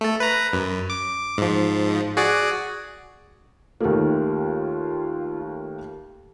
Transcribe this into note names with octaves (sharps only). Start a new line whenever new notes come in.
A3 A4
B4 A#5
F#2
D6
G#2 F3
F#4 G#4 D5
D#2 A3 A#3 F4 G4 A4